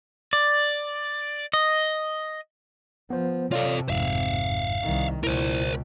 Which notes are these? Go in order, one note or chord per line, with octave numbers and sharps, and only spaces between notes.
D5
D#5
F3 B3 C5
C3 F4 A4 C#5 D5 F5
G#1 F2 G#2 E5 F5
C2 D#3
C#2 B2 E4 A#4 C5